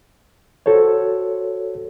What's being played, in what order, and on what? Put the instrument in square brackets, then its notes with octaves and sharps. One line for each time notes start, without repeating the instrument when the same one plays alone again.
[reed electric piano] F#4 A4 C5 C#5